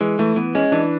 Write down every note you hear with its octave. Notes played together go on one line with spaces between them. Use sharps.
E3 G#3
E3 A3
E3 B3
G#3 C#4
E3 D4